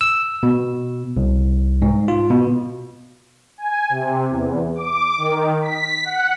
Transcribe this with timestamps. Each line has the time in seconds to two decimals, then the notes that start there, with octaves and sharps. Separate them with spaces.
0.01 E6
0.43 B2
1.17 C2
1.82 G#2
2.08 F4
2.30 B2
3.58 G#5
3.89 C3
4.30 E2
4.75 D6
5.18 D#3
5.62 B6
6.04 F#5